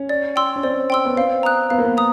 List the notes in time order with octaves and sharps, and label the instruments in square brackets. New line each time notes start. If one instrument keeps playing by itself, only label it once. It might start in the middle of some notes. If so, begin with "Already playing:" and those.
Already playing: [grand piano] C#4
[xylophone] D5
G5 C6 E6
[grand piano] C#4
[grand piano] C4 [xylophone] D5
[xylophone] G5 C6 E6
[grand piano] B3
[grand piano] C4 [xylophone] F5
[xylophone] A#5 D#6 F#6
[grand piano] B3 [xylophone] F5
[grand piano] A#3
B3
[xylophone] A#5 D#6